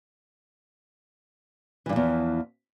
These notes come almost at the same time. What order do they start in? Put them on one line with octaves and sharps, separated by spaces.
E3 G2 F3 E2